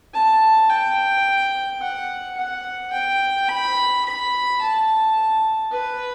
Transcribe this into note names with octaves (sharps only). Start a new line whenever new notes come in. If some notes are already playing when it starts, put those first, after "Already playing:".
A5
G5
F#5
F#5
G5
B5
B5
A5
B4